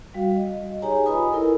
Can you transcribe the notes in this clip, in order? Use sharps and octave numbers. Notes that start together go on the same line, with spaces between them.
G3 F#4 F5
D#5
D#4 G4 G#4 C#5 G#5 A#5
F4 B4 D#5 G#5 B5 D#6
E4 A4 A#4